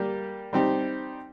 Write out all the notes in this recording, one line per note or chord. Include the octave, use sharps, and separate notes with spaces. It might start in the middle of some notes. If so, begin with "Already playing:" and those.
Already playing: G3 A#3 G4
G3 C4 D#4 G4